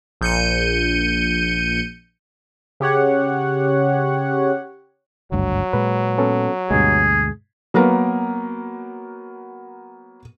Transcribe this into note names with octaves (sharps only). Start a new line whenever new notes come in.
A#1 G6 C#7 D#7
C#3 G4 C#5 F#5
G#1 D2 G2 F#3
A#2 G#3 B4
B3 C#4 A4
D2 G2 B2 G#3 G#4
F#3 A#3 B3 A#4